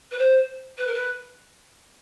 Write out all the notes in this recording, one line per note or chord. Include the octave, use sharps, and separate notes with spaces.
B4
C5
B4
A#4
B4